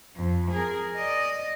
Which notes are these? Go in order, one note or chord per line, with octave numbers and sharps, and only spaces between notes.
F2
G#4 A#4
D5 D#5